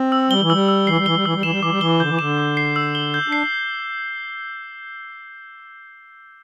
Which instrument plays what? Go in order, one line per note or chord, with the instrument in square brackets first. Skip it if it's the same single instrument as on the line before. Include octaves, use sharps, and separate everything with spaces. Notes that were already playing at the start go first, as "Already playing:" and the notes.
Already playing: [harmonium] C4
[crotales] E6
[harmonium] G3 [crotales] G7
[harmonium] E3
[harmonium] G3 [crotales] E6
[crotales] E6
[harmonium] E3 [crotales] C7
[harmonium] G3
[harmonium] E3 [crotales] G7
[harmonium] G3
[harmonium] E3 [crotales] E6
[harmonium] G3
[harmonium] E3 [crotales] E7
[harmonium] G3
[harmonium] E3 [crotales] D6
[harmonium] G3
[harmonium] E3 [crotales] G7
[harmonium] D3 [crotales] G6
[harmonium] E3
[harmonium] D3 [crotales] E7
[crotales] D6
C7
E6
G7
G6
[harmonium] D4 [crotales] C7